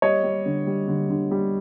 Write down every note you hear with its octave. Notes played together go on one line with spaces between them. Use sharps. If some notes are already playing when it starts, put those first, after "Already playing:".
G3 C#5 D#5
G3
D3
G3
D3
D3
G3